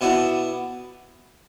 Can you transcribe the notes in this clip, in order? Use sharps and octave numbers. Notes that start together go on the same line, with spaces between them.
B2 B3 E4 D5